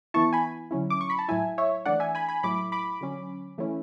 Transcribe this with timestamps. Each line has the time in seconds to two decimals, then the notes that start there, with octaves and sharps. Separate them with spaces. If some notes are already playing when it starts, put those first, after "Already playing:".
0.14 E3 B3 E4 A5 C#6
0.33 G#5 B5
0.71 D3 F#3 C#4 E4
0.90 D6
1.01 C#6
1.10 B5
1.19 A5
1.29 A2 F#3 A3 E4 E5 G#5
1.58 C#5 E5
1.86 E3 A3 D4 D5 F#5
2.00 E5 G#5
2.15 G#5 B5
2.29 G#5 B5
2.43 A2 F#3 A3 E4 B5 D6
2.72 B5 D6
3.01 D3 F#3 C#4
3.58 E3 A3 C#4 E4